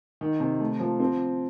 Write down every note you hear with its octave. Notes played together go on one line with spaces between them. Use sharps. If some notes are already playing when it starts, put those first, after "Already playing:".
D#3
C3
A3
F3
C4